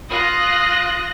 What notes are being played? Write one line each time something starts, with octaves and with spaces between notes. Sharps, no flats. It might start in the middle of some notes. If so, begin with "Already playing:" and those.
F4 D#6 F#6 A#6